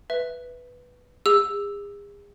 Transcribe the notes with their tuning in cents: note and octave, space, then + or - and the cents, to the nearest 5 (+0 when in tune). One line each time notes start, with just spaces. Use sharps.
B4 +0 E5 +0
G#4 -40 E6 +0